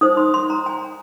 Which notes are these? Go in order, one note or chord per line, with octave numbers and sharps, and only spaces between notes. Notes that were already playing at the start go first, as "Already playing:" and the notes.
D#4 C5 D#6
C6
C6
A#5
G#5